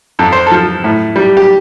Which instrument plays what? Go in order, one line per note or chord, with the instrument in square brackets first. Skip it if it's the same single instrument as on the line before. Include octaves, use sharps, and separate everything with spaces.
[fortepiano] F2 A4
C5
F3 A4
A2
G3
G4